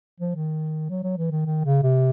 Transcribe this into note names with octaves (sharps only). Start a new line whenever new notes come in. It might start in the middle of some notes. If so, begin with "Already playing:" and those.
F3
D#3
F#3
F#3
E3
D#3
D#3
C#3
C3